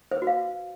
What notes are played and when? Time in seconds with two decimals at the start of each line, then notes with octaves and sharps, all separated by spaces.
0.11 C5
0.17 B4
0.22 F#4
0.27 F5